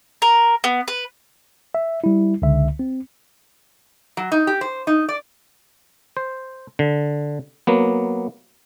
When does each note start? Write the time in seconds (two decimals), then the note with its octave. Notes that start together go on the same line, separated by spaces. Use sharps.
0.22 A#4
0.64 B3
0.88 B4
1.74 E5
2.04 G3 E4
2.42 C#2 D3 E5
2.79 C4
4.17 F#3
4.32 D#4
4.47 G4
4.61 C5
4.87 D#4
5.08 D5
6.17 C5
6.79 D3
7.67 F#3 A#3 B3